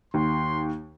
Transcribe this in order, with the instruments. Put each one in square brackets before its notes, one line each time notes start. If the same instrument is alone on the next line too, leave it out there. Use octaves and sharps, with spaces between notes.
[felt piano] D#2 [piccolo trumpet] C6